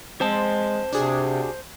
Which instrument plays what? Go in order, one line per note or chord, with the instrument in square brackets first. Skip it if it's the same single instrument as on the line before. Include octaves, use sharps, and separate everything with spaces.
[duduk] G#3 [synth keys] C4 [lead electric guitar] C5 A5
[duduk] C3 [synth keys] D4 F#4 G#4